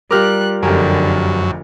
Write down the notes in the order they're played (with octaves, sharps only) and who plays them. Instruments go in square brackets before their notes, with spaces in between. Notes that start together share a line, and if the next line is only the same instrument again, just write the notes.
[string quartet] G3 F#6 [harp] F4 G4 A#4 [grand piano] D6 F6
[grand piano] F1 G4 A#4 [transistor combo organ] F#2 [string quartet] D3 [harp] G#5